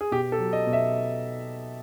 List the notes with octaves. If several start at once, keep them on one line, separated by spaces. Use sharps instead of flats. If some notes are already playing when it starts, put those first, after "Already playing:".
G#4
B2 G4
A4
F#3
D#5
B2
E5